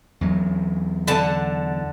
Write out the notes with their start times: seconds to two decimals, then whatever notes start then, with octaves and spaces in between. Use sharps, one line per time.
0.21 E2 F#3
1.08 D3 F#5 A5